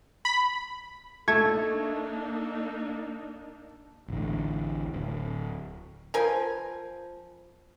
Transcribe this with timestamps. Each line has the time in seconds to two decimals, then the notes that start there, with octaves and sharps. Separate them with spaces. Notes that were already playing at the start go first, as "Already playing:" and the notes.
0.25 B5
1.28 A3 A#3 D4 D#4 A5 C#6 E6 G#6
4.08 A1 D2 A2
4.93 D1
6.14 F3 A#4 B4 G#5